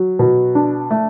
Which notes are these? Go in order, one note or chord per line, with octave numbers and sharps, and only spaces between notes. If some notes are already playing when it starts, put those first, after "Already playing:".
Already playing: F#3
B2
D4
A3